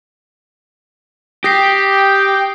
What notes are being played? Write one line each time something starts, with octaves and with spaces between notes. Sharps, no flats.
G4 G5 D#6 A#6 C7